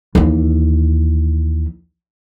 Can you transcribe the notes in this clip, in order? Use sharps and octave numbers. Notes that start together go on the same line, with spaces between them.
D#2 E3